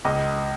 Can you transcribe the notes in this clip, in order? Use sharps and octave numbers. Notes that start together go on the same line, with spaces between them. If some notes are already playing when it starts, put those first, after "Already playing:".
C#2 D#5